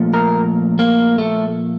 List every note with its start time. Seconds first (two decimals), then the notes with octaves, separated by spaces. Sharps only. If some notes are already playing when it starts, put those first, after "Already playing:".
Already playing: A#2 F3 A3
0.14 A#4
0.79 A#3
1.18 A3